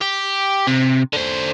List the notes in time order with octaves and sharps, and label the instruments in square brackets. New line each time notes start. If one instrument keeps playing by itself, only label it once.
[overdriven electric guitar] G4
C3
D3 C5